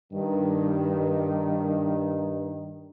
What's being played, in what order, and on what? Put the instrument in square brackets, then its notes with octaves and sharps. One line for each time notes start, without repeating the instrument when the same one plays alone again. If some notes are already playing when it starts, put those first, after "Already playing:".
[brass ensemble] G2 D#3